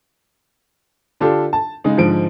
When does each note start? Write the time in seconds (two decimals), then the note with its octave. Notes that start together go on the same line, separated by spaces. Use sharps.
1.20 D3 D4 F4 G4 A4
1.53 A5
1.84 C#3 G#3 D#4
1.97 G#2 D3 F3 D7